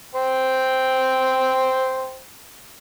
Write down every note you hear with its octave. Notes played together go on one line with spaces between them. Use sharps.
C5 G5